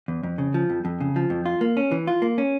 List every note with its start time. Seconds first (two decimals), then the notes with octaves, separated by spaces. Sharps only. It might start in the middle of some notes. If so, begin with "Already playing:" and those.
0.08 E2
0.23 F2
0.38 C#3
0.54 F3
0.70 F2
0.85 F2
1.00 C#3
1.16 F3
1.30 F2
1.46 F4
1.61 A#3
1.77 C#4
1.91 E3
2.07 F4
2.22 A#3
2.38 C#4